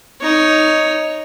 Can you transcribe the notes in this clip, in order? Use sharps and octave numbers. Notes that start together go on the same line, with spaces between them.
D#4 C#5